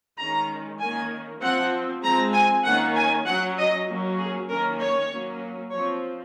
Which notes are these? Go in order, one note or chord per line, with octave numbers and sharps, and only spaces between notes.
D#3 G#3 C#4 A#5
D#3 A#3 C#4 G#5
F3 C4 F#5
F3 G#3 C4 A#5
G#5
D#3 A#3 C#4 F#5
G#5
F#3 C#4 F#5
D#5
F#3 A#3 C#4
G#4
D#3 A#3 C#4 A#4
C#5
F#3 A#3 C#4
F3 C4 C#5